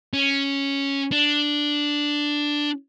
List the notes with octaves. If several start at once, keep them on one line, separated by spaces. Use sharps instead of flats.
C#4
D4